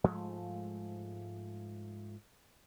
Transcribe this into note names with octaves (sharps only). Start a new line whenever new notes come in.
G#2 F3 G#3 A3